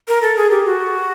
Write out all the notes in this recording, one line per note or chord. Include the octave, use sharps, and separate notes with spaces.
A#4
A4
G#4
G4
F#4